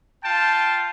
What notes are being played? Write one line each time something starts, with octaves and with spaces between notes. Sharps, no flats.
F4 G5 A5